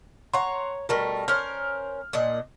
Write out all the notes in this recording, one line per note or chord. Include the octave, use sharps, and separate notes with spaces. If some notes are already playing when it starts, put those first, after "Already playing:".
C#5 F#5 A#5 C6
B2 G3 A3 A#4
C#4 A#4 C5 F6
A#2 D4 D#5